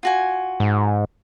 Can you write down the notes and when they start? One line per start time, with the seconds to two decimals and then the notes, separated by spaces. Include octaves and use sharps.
0.03 F4 F#4 G#5
0.60 G#2